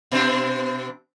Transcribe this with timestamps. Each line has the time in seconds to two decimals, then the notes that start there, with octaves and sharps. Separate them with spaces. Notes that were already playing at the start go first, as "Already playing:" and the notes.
0.11 B2 C4 D4